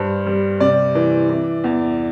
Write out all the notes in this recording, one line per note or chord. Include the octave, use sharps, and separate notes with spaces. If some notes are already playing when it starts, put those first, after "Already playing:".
Already playing: G2 C5
G3
C3 D5
E3
E3
E2